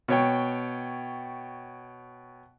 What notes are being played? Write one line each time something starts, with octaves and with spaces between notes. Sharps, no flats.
B2 C#5 G5